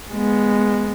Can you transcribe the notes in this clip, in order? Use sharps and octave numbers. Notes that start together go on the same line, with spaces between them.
G#3 B3